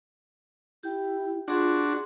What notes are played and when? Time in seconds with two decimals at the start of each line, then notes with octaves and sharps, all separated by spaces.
0.83 E4 G4 G5
1.48 D4 F4 F#4 G#4 C6